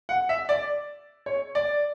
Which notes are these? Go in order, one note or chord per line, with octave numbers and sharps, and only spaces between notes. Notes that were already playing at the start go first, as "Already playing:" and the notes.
F#5
E5
D5
C#5
D5